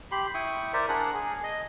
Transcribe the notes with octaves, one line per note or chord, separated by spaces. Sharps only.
G4 B5 C6
E4 G5 C#6 D#6
A#4 C5 D5 E5
D4 G#4 A#4 F#5
G#4
D#5